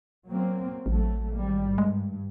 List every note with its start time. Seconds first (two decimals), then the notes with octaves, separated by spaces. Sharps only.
0.26 F#3 A#3 C4
0.86 A1 F#3 A3
1.34 G#1 G3 A#3
1.78 G2 G#3